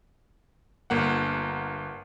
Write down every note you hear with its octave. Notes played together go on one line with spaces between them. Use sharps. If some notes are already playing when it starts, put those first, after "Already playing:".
G1 A#3 F#5